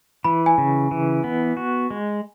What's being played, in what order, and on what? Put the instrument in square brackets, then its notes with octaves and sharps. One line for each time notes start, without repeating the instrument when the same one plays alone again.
[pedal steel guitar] E3 [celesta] B5
[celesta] G#5
[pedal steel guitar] C#3
E3
B3
F#4
G#3